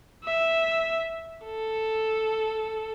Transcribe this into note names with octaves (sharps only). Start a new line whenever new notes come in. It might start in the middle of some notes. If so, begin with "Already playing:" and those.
E5
A4